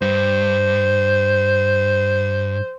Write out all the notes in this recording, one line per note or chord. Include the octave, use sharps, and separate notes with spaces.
G2 C5